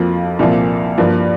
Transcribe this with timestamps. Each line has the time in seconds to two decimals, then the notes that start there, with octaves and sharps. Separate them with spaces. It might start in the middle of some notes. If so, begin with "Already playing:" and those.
Already playing: F2 F3 A#3 F4
0.39 C2 A#2 F3 A#3
0.98 G2 F3 A#3